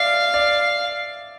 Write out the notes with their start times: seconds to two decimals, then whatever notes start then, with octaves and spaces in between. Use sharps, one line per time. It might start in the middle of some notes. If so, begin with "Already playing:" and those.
Already playing: D5 E5 F5
0.34 D5